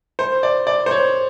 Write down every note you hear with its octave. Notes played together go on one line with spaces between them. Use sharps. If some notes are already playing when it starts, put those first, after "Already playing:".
C5
D5
D5
C5
C#5